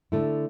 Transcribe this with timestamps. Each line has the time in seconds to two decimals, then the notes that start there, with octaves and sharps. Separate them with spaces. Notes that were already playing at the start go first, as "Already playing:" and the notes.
0.12 D3 A3 E4